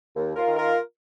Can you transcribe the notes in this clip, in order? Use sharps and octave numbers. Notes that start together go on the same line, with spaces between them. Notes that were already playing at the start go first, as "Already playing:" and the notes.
D#2
F4 A#4
D#3
F4 A#4